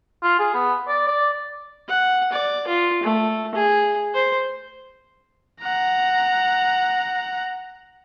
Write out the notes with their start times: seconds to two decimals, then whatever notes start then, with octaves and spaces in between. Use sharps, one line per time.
0.23 F4
0.39 G#4
0.54 B3
0.88 D5
1.08 D5
1.88 F#5
2.32 D5
2.68 F4
3.03 A3
3.55 G#4
4.14 C5
5.61 F#5 A#5